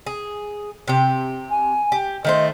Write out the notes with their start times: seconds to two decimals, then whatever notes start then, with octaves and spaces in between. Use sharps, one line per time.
0.06 G#4
0.88 C3 G4
1.50 G#5
1.92 G4
2.25 D#3 A3 C5 D#5